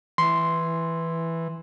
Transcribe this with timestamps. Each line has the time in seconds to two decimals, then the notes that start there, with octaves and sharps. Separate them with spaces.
0.18 E3 C6